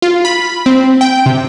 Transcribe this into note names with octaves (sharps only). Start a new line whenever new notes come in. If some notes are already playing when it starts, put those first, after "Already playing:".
F4
B5
C4
G5
C3